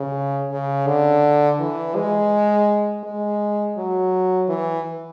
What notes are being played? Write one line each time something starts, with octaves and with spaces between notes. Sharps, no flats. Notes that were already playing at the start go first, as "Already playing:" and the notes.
Already playing: C#3
C#3
D3
E3
G#3
G#3
F#3
E3